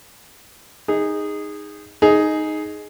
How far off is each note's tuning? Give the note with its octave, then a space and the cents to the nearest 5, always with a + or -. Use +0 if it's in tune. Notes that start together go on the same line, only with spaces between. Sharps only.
D#4 +0 G#4 -15
D#4 +0 G#4 +10